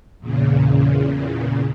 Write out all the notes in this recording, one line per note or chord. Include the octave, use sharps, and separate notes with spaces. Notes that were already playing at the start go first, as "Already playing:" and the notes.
E2 A#2 C#3